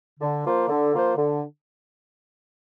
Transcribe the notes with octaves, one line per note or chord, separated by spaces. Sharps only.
D3
F3 A#3 F4 C5
D3
F3 A#3 F4 C5
D3